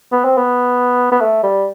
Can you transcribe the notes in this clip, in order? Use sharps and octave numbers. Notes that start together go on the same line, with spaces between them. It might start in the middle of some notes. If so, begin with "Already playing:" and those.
B3
C4
B3
B3
A3
G3